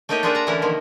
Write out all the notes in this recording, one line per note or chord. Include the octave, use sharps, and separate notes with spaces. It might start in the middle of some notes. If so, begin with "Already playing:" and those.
A3 A#3 D#4 G4 C#5 D#5
D4 F4 G#4 A#4 E5 F#5
A5 A#5
D3 E3 A3 C#4 E4 A#4
C3 D#3 F3 A#3